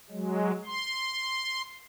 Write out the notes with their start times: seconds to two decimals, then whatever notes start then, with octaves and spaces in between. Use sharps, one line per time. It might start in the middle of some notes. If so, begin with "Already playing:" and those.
0.11 F#3 G#3
0.65 C6